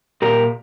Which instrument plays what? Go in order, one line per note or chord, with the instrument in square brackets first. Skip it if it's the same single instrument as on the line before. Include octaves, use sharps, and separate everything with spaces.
[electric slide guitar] A#2 G4 A#4